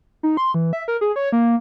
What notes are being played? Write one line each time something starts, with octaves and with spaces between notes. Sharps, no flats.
D#4
C6
E3
E5
A#4
G#4
C#5
A#3